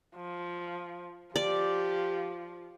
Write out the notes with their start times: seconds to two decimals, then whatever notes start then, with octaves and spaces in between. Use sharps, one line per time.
0.16 F3
1.36 F3 G4 D5